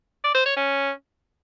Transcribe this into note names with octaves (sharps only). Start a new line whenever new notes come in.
D5
C5
C#5
C#4